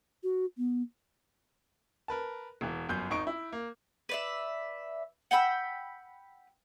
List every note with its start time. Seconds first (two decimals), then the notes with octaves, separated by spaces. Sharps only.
0.23 F#4
0.58 B3
2.08 A#4 B4 A5
2.61 E1 E3
2.89 G1 F#2 G6
3.10 G#1 D#4 C#6 D7
3.27 E4
3.53 A#3
4.09 B4 D5 E5
5.31 F#5 G5 B5 E6